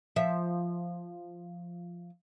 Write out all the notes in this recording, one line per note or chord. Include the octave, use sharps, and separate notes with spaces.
F3 E5